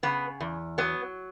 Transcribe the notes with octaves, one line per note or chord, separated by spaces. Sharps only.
C#3 B3
E2
F#3 B3